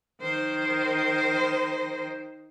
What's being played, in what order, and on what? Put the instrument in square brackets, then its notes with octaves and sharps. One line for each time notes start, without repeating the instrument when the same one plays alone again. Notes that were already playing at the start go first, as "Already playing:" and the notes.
[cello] D#3 C5